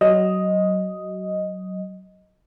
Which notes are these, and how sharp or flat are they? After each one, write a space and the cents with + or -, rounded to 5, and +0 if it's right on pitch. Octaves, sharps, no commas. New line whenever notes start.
F#3 +20 D#5 +5